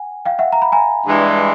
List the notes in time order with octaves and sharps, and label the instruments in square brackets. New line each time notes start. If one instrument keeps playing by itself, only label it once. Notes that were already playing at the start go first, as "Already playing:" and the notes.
Already playing: [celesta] F#5 G#5
F5 G5
E5 F#5
A#5
B5
G#5 A#5
[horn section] G2 E3 G#3